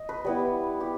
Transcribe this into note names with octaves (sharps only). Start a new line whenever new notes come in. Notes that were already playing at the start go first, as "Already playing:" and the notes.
Already playing: D#5
B4
G3 B3 E4
G4